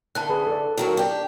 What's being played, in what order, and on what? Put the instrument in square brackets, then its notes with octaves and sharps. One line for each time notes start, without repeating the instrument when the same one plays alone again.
[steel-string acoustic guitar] D3 A3 [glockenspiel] A5 F#6
[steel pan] G#4 B4
A4 D5
[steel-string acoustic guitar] D#3 F#3 A#3
D4 G4